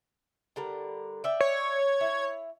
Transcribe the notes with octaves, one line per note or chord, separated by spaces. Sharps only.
D3 G3 A#4
D5 E5 G5
C#5
E4